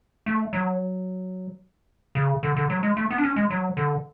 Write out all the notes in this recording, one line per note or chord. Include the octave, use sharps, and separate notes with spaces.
A3
F#3
C#3
D3
D3
F#3
G#3
A3
B3
D4
C#4
G#3
F#3
D3